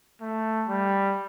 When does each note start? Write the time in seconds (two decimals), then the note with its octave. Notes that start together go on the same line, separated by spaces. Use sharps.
0.21 A3
0.68 G3